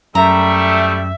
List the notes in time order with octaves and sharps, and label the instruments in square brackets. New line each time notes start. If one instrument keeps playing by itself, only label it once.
[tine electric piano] F#2 [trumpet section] G3 A3 [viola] E5 [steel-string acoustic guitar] A#5